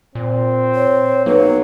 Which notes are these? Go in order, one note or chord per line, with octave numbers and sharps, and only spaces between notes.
A#2 C4
C#5
B1 F#3 A#3 B4